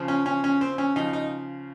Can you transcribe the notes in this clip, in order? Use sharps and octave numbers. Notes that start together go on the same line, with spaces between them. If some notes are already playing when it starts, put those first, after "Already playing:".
Already playing: C#3 F3
C#4
C#4
C#4
C4
C#4
C#3 F3 D#4
D#4